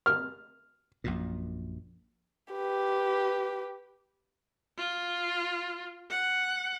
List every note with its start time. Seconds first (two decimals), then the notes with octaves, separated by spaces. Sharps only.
0.06 F6
1.04 A#1 F#2 A#2
2.53 G4 B4
4.78 F4
6.10 F#5